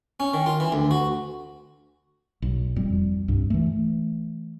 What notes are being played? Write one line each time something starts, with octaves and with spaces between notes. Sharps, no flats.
C#4
D#3
F4
E3
D2
F#4
B1
F1 F2 G3
C2 G2 C3
E3 A3